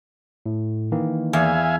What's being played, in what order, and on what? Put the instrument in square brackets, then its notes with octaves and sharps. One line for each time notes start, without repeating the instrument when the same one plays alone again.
[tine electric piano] A2
D#3 E3 A#3
[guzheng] E2 [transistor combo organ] E5 F5 G#5